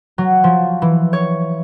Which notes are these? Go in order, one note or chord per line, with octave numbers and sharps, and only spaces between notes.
F#3
F3
E3
C#5